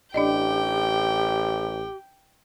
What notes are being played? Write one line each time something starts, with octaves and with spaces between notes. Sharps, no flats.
A1 D4 G4 D5 D#5 G5